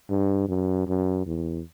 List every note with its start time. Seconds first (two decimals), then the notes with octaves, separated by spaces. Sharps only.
0.09 G2
0.49 F#2
0.87 F#2
1.26 E2